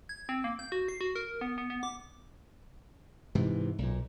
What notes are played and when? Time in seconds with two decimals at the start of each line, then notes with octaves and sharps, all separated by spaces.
0.09 G#6
0.29 C4
0.44 A#3
0.59 G6
0.72 F#4
0.89 C7
1.01 F#4
1.16 A#4
1.41 B3
1.58 B3
1.70 B3
1.83 D6
3.35 G#2 C3 E3
3.78 B1 A#2